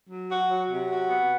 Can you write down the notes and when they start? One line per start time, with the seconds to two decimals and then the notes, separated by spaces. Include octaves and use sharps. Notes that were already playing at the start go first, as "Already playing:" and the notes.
0.09 F#3
0.30 F#4
0.49 F#3
0.70 C3
0.90 F#4
1.09 B3